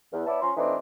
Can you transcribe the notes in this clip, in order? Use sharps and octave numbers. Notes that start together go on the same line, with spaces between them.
E2
B3 E4 C#5 D5 E5 A5
F3 C#4 A#5 C6
B2 E3 A3 C4 D4 D#4